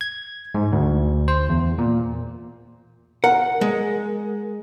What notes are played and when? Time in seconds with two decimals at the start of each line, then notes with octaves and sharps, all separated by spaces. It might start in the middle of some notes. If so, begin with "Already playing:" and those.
0.01 G#6
0.55 G#2
0.72 D2
1.28 C5
1.49 E2
1.78 A#2
3.24 A#4 F#5
3.61 G#3